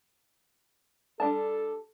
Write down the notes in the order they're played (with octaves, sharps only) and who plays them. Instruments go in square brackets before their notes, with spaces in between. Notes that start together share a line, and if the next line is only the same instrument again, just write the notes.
[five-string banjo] G3 D4 A5 [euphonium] A4